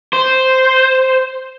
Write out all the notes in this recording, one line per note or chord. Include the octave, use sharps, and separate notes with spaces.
C5